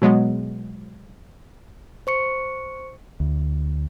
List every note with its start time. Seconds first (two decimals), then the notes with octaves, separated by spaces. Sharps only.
0.02 B2 F#3 G#3 B3
2.07 C5 C#6 C#7
3.20 D2